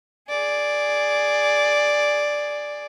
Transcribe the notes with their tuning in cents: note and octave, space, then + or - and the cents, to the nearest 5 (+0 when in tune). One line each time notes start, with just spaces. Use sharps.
G#4 +0 D5 +0